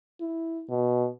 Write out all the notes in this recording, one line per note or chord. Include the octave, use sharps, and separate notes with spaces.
E4
B2